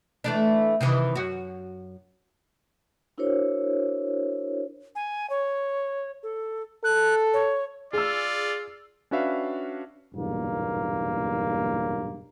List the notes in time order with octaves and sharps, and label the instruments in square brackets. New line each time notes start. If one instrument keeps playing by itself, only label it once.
[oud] E3 A3 D4
C3 D#3 E3
F#2 F#4
[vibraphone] D4 E4 F#4 A#4 C5 C#5
[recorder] G#5
C#5
A4
[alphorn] A4 [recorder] F#6
[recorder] C#5
[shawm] F4 [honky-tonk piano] G#4 E6 [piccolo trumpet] D5
[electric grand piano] C#4 D4 F#4 B4 E5 F5
[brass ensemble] F#1 B1 E2 G2 A#2 A#3